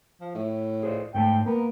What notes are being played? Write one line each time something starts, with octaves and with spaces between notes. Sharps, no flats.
F3
A2
G#4 C5 D5
G#2 A3 G5 A5
A#3 B3 A#4